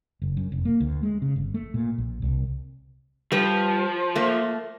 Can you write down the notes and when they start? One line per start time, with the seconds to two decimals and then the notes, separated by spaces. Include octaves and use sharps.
0.22 F#1
0.37 F#2
0.52 F1
0.65 A#3
0.80 D2
1.03 G#3
1.22 C#3
1.36 G1
1.54 A3
1.74 A#2
1.98 A#1
2.22 C2
3.32 F3 G3 B4
4.16 A3 A#3